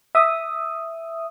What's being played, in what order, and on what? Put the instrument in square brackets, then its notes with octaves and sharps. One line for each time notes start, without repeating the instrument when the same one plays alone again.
[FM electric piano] E5 D#6